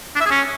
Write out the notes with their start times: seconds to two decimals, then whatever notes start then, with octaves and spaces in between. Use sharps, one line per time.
0.16 D4
0.21 E5
0.26 G#4
0.31 C#4